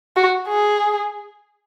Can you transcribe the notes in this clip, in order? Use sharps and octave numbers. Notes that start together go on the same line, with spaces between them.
F#4
G#4